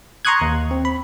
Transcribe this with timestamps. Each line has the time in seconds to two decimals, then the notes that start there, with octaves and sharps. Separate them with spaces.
0.25 A#5 C6 C#6 D#6 F#6 G#6
0.41 D#2
0.71 C4
0.85 B5